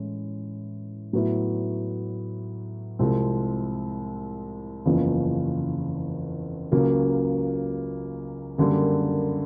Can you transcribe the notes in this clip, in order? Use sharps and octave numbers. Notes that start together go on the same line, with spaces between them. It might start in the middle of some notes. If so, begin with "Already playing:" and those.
Already playing: A2 E3 G#3 C#4 E4
A2 F#3 B3 E4
C2 C3 F3 G#3 C4
F#1 E2 C#3 F3
C#2 C#3 F#3 A#3
F#2 D3 G3 A#3